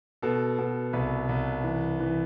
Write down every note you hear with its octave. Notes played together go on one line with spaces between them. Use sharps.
B2 A4
B2
C2 B4
C2
E3
E3